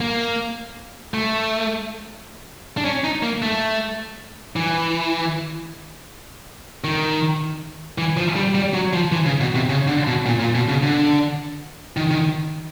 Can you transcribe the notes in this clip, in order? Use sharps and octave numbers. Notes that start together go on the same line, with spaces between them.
A#3
A3
D4
C#4
D#4
A#3
A3
E3
D#3
E3
F3
G3
G3
F#3
F3
E3
C#3
B2
C3
C#3
D3
B2
A#2
A#2
B2
C#3
D3
D#3
D#3